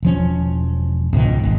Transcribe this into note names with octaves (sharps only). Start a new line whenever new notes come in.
E1 F3 C#4
C#2 G#2 B2 D#3
G#1